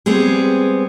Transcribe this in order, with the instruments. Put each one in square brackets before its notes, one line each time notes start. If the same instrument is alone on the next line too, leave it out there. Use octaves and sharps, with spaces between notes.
[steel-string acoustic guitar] G3 G#3 B3 C4 G4 G#4